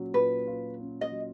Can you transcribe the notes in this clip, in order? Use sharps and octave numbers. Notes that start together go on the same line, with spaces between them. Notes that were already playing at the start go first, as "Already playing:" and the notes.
Already playing: A#2 F#3 C#4
A#2 B4
F4
C#4
D#5
F#3